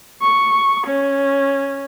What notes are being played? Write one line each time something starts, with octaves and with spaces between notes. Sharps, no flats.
C#6
C#4